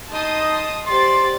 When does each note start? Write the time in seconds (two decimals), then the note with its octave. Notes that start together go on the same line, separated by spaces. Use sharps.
0.12 D#4 D#5 A5 C6 D#6
0.87 G4 C5 D5 C6 A6